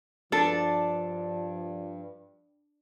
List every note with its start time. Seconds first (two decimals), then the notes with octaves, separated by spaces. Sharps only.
0.32 G2 F3 D4 A4